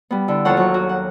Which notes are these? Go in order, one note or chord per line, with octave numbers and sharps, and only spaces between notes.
G3 B3
D3 E4
D#2 F3 A4 C#5 F#5
F#3 C#6
F#4
F#5